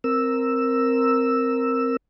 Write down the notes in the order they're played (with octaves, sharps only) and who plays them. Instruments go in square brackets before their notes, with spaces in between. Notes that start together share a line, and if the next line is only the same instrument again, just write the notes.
[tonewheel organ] C4 A#4 E6